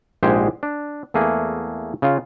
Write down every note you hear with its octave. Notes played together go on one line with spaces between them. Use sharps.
A#1 G#2 G#3 G4 C5 G#5
D4
E2 A3 A#3 G#4
C#3 F4